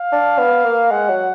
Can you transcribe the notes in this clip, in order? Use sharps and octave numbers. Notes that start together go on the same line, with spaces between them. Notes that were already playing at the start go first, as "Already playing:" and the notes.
Already playing: F5
D4
B3
A#3
G#3 F#5
F#3